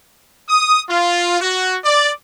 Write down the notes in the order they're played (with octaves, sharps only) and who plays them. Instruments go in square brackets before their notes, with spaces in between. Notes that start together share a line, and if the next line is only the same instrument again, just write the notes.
[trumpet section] D#6
F4
F#4
D5